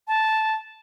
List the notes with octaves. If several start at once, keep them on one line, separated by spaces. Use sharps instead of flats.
A5